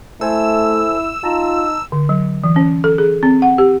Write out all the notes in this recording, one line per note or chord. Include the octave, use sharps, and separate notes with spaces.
A3 E4 A4 C5 G#5 E6
D#4 F4 A5 A#5
D3
F#3
E3
C#4
A4
G#4
C4
F#5
G4